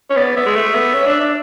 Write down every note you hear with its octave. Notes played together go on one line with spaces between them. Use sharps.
C#4 C#5
B3 D5
B3 E5
G#3
A3
B3
C#4
D4
D4